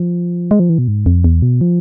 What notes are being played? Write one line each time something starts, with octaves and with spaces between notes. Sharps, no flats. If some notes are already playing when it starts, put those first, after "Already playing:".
Already playing: F3
G#3
F3
E3
B2
G#2
F2
E2
B2
F3